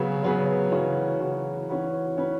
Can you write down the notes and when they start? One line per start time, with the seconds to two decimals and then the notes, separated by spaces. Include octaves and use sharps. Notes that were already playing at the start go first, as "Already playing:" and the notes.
Already playing: C#3 F#3 B3 G#4 B4
0.23 C#3 F#3 B3 G#4 B4
0.72 C#3 E3 C#4 F#4
1.20 C#3 E3 C#4 F#4
1.69 E3 C#4 F#4 B4
2.17 E3 C#4 F#4 B4